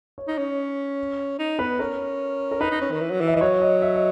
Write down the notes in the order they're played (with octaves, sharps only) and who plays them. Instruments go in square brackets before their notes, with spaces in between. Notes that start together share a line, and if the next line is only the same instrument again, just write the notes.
[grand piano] C#5
[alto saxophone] D#4
C#4
D#4
[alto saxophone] B3 [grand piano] B4
[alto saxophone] C#4 [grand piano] A#4
[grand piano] A#4
[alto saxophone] D#4 [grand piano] B4
[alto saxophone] D#4
C#4
D#3
E3
F#3
E3
[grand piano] E5
[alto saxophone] E3 [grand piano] D#5
[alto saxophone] F#3 [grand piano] C#5
[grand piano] D#5
E5
D#5